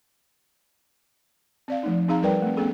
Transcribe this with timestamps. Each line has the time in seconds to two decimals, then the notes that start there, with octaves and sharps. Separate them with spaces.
1.68 C4 D5 F5
1.83 F3 A3 D#4
2.08 C4 D#4 G#4 F5 A#5
2.22 G3 A#4 B4 D5 G5
2.42 A3 C4
2.57 A3 B3 C#4 G#4 A4